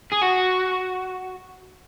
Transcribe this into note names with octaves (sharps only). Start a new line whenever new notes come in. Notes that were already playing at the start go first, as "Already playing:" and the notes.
G#4
F#4